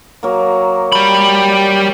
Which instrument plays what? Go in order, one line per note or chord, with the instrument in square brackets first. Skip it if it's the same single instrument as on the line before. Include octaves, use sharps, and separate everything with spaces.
[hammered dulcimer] F#3 A#3
[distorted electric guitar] G3 B5